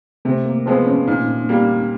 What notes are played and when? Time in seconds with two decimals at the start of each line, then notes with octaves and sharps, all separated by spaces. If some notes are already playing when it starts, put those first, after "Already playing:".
0.25 C3 A3
0.46 A#3
0.66 F3 G#3 B3 C4
0.87 C#4
1.07 A#2 D#4
1.49 G3 A#3